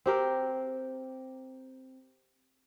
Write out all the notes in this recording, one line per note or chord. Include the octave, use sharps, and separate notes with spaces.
C4 G4 A#4